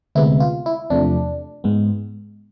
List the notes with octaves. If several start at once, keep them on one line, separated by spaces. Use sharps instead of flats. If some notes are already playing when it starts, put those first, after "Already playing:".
D2 C3 G#3 B3 E4
F4
E4
E2 C3 F3 A3 D4
G#2 G#3 B3